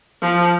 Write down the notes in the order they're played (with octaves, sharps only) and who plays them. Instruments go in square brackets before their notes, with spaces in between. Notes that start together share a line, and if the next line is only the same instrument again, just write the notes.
[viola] F3